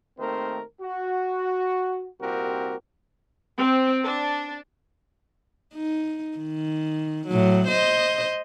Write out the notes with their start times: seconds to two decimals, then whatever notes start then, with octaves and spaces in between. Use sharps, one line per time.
0.19 D#2 D#3 A3 C4 A#4 C5
0.81 F#4
2.21 C2 A#2 C4 F#4 G4 A#4
3.57 C4
4.04 D4
5.74 D#4
6.38 D#3
7.27 A2 F#3
7.67 C5 D#5